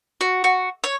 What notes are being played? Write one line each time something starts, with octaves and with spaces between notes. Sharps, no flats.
F#4
F#4
C#5